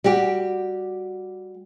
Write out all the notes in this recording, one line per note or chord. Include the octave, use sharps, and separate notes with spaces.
G3 F#4 G4